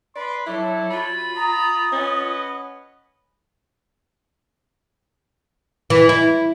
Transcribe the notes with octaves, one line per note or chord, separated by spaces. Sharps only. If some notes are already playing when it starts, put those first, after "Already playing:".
B4 D5 C6
F#3 D4 E4 A4 C#5
F4 F#4 B5
A#5 D#6
C#4 B4 D#5 F#5
E3
E4